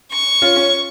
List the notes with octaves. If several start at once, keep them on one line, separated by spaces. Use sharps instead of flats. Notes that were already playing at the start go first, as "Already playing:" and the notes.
C#6
C#4 F4
C#4